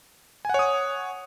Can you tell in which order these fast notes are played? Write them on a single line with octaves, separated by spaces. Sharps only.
G#5 F#5 C#5 D#6